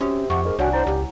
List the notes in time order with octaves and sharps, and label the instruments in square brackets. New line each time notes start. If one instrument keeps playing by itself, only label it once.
[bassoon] C3 [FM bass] C#4 [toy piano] F#4 D#6
[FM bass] F2 [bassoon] C3 [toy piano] G4 D6 [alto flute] F#5
[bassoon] G#2 [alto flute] A#4
[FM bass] C2 [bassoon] D4 [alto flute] F#4 [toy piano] C#5 F#5 G#5
[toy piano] E4 [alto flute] C5
[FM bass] C#2 [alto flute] G4